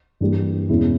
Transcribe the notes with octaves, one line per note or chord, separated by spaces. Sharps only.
G2 E3 G3 A#3
E2 B2 G#3 C#4 E4